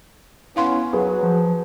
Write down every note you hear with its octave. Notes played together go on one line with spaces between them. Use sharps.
B3 C#4 E4 F5 C6
F#3 G#4 B4
F3